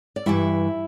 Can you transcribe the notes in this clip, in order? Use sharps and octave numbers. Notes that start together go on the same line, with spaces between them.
D5
G2 E3 G3 E4 E5